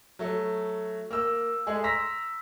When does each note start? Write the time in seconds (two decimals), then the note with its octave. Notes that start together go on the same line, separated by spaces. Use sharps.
0.19 F#3 A3
1.10 A#3 E6
1.67 G#3 A3 G#4
1.84 A#5 C6 E6 A#6 B6